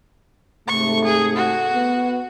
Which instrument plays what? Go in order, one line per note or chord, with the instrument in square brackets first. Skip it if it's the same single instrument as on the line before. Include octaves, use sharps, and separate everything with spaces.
[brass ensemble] G#2 C3 A3 [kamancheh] C#6
[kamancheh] G#4
F#4
[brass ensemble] B3